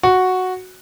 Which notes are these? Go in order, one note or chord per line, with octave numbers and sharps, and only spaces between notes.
F#4